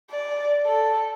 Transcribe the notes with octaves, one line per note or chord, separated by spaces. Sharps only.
D5
A4